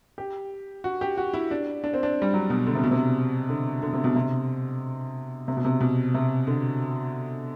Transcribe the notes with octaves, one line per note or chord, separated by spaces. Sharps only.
G4
F#4
G4
F#4
E4
D4
D4
C4
D4
G3
F#3
B2
D3
C3
B2
C3
D3
D3
C3
B2
C3
C3
B2
C3
B2
C3
D3